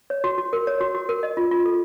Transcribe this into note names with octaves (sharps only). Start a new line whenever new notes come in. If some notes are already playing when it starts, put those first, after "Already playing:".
C#5
F#4
F#4
A#4
C#5
F#4
F#4
A#4
D#5
F4
F4
A4